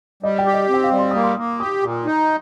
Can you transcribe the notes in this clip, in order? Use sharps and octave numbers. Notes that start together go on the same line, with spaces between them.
G3 D#5
G5
G4
D#5
C4
G5
F5
G3
C6
A#3 D#6
C6
A#3
G4 D#6
A#2
D#4